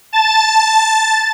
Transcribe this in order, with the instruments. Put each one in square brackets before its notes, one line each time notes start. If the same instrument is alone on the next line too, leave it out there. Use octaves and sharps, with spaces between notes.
[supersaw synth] A5 A6